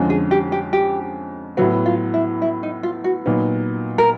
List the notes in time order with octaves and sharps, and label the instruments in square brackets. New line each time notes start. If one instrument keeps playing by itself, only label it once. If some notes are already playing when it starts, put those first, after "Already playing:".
Already playing: [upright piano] F2 D3 F3 G#3 C#4
[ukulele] G#4
G4
G4
G4
[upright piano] A2 F#3 B3 [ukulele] F#4
[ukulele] F4
E4
E4
D#4
F4
F#4
[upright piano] A#2 F#3 B3 D#4
[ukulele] A#4